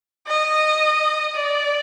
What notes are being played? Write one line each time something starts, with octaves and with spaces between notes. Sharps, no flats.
D#5
D5